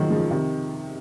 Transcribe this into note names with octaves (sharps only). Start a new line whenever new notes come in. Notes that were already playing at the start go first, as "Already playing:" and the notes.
Already playing: D#3 F3 F#3 G#3 A#3
C#3 F3
C3 D#3